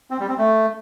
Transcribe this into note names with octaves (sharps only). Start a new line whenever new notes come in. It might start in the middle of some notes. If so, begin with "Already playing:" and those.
C4
G3
C4
A3